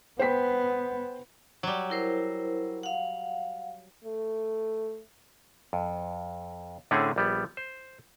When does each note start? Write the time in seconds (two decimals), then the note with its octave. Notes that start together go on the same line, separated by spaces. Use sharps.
0.19 B3 C5 G5 B6
1.63 F#3 G3
1.90 E4 A#4 C5
2.83 F5 F#5
4.04 A3
5.73 F2
6.91 A2 D3 A3 C4 C#4 G#4
7.16 A#1 G3 B3
7.57 C5